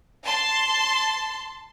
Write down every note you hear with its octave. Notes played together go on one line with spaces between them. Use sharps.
A5 C6